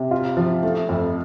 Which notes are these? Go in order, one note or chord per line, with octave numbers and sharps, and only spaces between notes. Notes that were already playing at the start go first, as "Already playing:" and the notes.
Already playing: C3
F4
F3
A3
F2